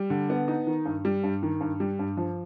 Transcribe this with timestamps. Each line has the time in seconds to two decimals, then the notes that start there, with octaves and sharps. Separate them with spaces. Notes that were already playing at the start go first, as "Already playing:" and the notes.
Already playing: G3
0.10 D3
0.30 B3
0.48 D#4
0.67 D#3
0.85 G2
1.05 G3
1.23 G2
1.43 D#3
1.61 G2
1.80 G3
1.99 G2
2.17 F3